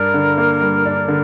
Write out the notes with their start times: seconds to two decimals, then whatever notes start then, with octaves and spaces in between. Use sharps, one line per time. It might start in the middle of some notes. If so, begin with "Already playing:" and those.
Already playing: G2 D4 A#4
0.14 D3
0.38 A#3
0.61 G2
0.86 D4
1.08 D3